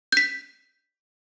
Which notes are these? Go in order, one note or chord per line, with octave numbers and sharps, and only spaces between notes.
G6 B6